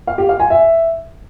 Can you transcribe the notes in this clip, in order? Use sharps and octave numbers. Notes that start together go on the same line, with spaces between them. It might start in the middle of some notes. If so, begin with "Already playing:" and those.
F5
G4
F5
G#5
E5